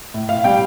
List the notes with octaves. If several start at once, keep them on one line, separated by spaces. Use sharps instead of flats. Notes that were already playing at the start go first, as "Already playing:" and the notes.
A2
A2 F5
G3 G5